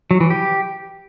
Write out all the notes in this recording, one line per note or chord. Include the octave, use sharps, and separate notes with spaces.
F#3
E3
G4